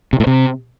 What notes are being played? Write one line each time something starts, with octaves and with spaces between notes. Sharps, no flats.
C3
A2
C3